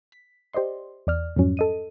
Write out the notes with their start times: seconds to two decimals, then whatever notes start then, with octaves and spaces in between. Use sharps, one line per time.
0.12 B6
0.53 G4 C5 D5 D#5 C6
1.07 E2 D5 F6
1.36 F2 G#2 F3 F#3 C#4
1.57 A4 D#5 D#7